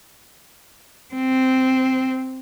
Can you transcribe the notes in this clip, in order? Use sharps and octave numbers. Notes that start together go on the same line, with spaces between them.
C4